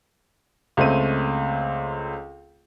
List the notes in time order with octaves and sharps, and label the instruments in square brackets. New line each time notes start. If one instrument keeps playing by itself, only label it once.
[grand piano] C#2 A3 C4 D#7